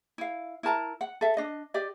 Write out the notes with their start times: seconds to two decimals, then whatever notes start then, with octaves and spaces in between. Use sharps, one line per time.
0.18 E4 F5
0.63 E4 A#4 A5 A#5
1.01 F#5
1.21 A4 E5
1.37 D4 D#5
1.74 G4 D5 D#5